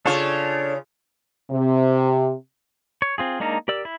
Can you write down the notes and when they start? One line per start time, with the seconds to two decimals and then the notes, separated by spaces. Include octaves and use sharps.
0.06 C#3 D4 F4 A4 C#5
1.51 C3
3.02 C#5
3.18 C4 F4 G#4
3.40 G#3 A#3 D4 D#4 A#4
3.68 G4 A#4 D5 E6
3.85 E4